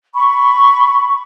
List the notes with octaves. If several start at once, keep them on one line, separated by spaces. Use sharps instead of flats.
B5 C#6